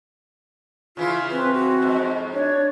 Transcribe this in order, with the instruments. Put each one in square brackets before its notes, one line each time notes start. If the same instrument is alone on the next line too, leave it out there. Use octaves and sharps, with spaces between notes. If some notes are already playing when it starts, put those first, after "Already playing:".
[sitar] C#3 E3 E4 [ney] F4
[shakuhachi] C4 [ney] B4
[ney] F#4
[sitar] F2 G#2
[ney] D4 [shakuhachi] C#5